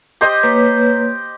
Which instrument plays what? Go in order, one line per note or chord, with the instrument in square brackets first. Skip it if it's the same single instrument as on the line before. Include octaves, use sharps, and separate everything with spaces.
[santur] G4 C5 D#5
[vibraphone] A#3 B4 C#5